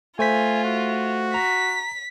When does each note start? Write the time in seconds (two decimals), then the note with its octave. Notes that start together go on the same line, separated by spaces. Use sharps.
0.19 A3 F4 C5 G#5 B6
0.64 F#4
1.34 A#5 B6